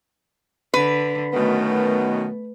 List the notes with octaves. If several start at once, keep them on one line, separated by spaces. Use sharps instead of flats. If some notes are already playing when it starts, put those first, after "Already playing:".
D3 B4
F#2 B2 D#3 A3 B3